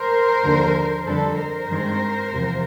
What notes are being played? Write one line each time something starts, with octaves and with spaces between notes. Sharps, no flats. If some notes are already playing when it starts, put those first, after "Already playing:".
Already playing: A#4 C5
D#2 D3 F3
F2 D3 G3 A4 B4
A#4 C5
G2 D#3 G#3 C4
E2 C3 F3